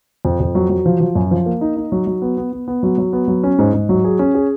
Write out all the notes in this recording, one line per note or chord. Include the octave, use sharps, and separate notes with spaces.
F2
F2
F#3
F#3
F3
F3
F#2
F3
A#3
D#4
D#4
F#3
F#3
B3
B3
B3
B3
F#3
F#3
B3
F#3
C#4
G#2
G#2
F#3
G#4
C#4
G#4